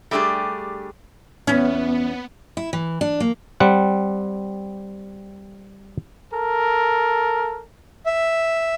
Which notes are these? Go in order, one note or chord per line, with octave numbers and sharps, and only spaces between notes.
G3 A3 D4 G4 G#4
E2 B3 C#4
E4
E3
D4
A#3
G3 C4 F#5
A4 A#4
E5